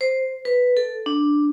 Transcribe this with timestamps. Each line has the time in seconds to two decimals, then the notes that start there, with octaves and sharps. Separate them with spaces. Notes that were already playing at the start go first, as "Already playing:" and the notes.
0.01 C5
0.45 B4
0.77 A4
1.06 D4